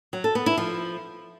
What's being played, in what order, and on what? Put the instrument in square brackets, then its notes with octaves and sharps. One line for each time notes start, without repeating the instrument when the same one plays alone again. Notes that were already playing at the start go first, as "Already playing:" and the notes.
[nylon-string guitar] F#3
A4
B3
E4
F3